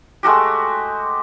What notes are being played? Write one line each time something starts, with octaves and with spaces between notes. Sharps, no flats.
G#3 A3 F#4 G4